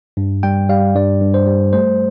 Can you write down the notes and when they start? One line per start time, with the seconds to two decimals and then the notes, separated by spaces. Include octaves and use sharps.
0.17 G2
0.43 G3 G5
0.69 G3 F5
0.95 G2 D5
1.21 G2
1.34 C5
1.47 G3
1.73 A3 C5